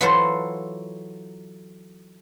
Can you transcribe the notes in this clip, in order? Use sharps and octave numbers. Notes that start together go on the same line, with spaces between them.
E3 F#3 E4 F4 A4 C5